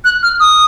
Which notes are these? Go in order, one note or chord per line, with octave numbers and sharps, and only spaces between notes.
F#6
F6
D#6